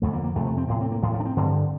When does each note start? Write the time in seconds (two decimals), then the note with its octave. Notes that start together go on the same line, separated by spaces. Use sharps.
0.02 F2 D3 A3
0.13 A#3
0.24 A#3
0.35 F2 A3
0.39 C3
0.47 A3
0.58 C4
0.69 A2 A#3
0.81 C4
0.92 A#3
1.03 A2 F3
1.14 F3
1.20 D4
1.25 C4
1.36 G2 D3